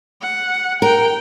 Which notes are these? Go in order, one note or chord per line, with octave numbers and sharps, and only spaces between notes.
F#5
A#4 G5